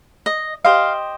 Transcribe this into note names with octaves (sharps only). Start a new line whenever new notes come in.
D#5
G4 C5 D#5 F5